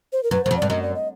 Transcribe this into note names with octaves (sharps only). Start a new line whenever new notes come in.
C5
A#4
F#2 B4
F#2 C5
F2
G2 D5
F#2 D#5
D5
D#5